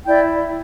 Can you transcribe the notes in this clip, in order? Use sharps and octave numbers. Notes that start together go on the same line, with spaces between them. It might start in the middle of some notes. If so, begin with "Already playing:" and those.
E4 D5 G5